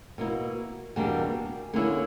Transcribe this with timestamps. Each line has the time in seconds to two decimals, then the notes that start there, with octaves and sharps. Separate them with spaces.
0.18 B2 A#3 E4
0.96 E2 B2 G3 A#3 D4
1.73 D3 A#3 C#4 E4